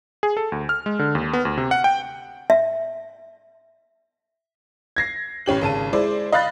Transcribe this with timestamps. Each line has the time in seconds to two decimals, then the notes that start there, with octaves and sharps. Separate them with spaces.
0.23 G#4
0.37 A4
0.52 D2
0.69 F6
0.86 G#3
0.99 D3
1.15 D#2
1.33 B3
1.45 D2
1.57 C3
1.71 F#5
1.84 G5
2.50 E5
4.96 G#6 A#6 C7
5.46 A1 C#4 G4 F#7
5.61 G#1 C#3 A5 D#7
5.93 G#3 E4 C5 D5
6.32 D#5 F5 B5 F#6 A6